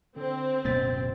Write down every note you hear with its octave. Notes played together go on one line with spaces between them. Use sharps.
D3 C4
D1 F#2 B2 B3 C5 A6